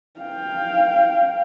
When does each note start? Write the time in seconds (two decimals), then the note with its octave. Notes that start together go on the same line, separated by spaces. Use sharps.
0.20 F5 G5